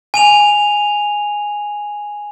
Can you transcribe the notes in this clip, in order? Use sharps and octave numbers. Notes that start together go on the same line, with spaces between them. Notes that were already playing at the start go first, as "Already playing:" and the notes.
G#5 D#7 F7